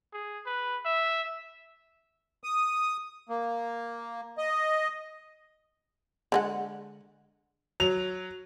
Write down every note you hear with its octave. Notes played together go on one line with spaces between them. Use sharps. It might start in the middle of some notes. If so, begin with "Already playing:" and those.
G#4
B4
E5
D#6
A#3
D#5
D3 G#3 F#5
F#3 F7